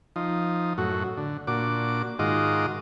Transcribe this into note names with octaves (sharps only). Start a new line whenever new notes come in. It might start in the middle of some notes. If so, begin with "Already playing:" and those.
F3 D#4
F#2 A2 F#4
D3
A#2 D4 F#4 D6
G#2 D#3 F4 F#4 D#5 D6